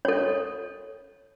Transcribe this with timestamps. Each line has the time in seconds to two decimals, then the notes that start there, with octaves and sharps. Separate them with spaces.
0.05 A4 C#5